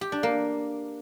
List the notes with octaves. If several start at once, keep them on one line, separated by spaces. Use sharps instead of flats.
G4
D4
A#3